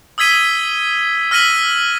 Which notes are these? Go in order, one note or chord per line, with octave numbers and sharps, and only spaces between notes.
D#6 E6 G#6 B6 D#7 G7
E6 F6 A#6 B6 D#7 F#7